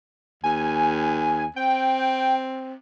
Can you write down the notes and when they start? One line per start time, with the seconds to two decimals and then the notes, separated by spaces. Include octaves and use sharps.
0.44 D#2 G#5
1.56 C4 G5